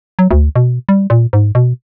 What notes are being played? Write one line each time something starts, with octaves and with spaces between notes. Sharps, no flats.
F#3
D2
B2
G3
A#2
G#2
B2